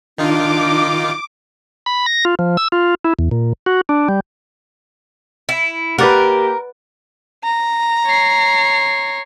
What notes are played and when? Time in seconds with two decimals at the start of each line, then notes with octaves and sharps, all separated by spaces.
0.18 D#3 D4 D#4 F4 D6
1.86 B5
2.06 A#6
2.25 F4
2.39 F3
2.57 E6
2.72 F4
3.05 E4
3.19 E2
3.31 A#2
3.66 F#4
3.89 D4
4.09 G3
5.49 E4
5.98 A#3 G4 A#4 B4 D5 F#5
7.44 A#5
8.06 C#5 C7